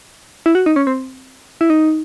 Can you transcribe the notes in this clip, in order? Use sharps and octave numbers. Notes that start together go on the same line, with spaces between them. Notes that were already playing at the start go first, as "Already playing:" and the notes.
E4
F#4
D#4
C#4
C4
E4
D#4